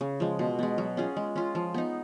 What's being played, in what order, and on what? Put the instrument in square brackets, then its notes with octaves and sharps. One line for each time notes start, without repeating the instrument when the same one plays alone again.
[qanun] C#3
F3 G#3
B2
G#3 B3
F#3
C#4 F4 G#4
G#3
C#4 F4
F3
B3 D#4